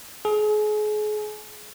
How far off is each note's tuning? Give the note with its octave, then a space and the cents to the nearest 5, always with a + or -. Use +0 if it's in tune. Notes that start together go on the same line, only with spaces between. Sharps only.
G#4 +35